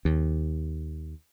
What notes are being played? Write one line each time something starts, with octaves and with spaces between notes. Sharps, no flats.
D#2